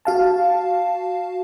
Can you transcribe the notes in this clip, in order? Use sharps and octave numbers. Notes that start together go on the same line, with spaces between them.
F#4 F5 A5